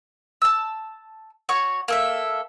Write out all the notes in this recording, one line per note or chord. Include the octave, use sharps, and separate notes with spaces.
A5 E6
F#4 C#5 C#6
A#3 A4 E5